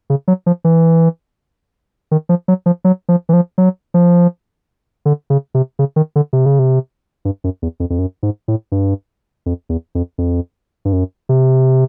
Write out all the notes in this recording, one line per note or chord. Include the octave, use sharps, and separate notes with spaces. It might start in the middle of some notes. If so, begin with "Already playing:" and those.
C#3
F#3
F3
E3
D#3
F3
F#3
F3
F#3
F3
E3
F3
F#3
F3
D3
C#3
C3
C#3
D#3
D3
C3
C#3
C3
G2
F#2
E2
F2
F2
F#2
G#2
A2
G2
F2
E2
F2
F2
G2
F#2
C3